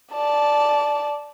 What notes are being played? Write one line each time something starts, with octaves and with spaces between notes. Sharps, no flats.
D5 A5